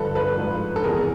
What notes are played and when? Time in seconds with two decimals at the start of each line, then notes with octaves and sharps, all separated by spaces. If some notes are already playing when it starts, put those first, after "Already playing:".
Already playing: G2 D3 F3 A4 B4
0.15 A4 B4
0.38 G#2 F3
0.76 A4
0.84 E2 C3 E3 G#4 A#4